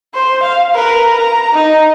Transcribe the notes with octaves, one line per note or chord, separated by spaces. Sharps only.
C5
F5
A#4 B4
A#5
D#4